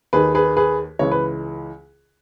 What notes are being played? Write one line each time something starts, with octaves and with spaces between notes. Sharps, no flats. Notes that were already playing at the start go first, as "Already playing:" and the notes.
D#2 D#3 G#4 B4
G#4 B4
G#4 B4
C#2 C#3 E3 C#5
B4